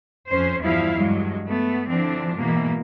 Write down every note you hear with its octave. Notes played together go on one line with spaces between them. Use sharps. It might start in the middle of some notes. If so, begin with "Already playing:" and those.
F2 C#4 C5
E2 G2 F3 G3 E4 F5
G2 F#3 G#3
A3 B3
D3 E3 F3 C4 D4
G#2 B2 E3 A#3